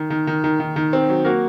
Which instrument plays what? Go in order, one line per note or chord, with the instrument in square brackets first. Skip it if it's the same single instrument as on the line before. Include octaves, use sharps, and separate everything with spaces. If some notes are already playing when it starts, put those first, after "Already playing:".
Already playing: [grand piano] D#3
D#3
D#3
D#3
D#3
D#3
C4
F#3
A#3 F#4 A#4